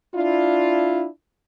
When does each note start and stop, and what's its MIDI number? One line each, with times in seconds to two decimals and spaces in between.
0.15 1.07 62
0.15 1.07 64
0.15 1.07 65